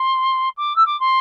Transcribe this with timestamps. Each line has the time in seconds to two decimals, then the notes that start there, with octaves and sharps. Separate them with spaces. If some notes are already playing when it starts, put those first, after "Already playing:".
Already playing: C6
0.57 D6
0.76 E6
0.86 D6
1.00 C6